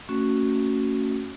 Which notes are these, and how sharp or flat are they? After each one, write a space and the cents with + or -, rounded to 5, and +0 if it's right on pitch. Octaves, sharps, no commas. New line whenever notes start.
A3 +40 C#4 +0 F#4 +0